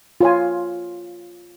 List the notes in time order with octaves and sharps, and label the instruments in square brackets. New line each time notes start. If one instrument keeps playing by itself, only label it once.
[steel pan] F4 C#5 G#5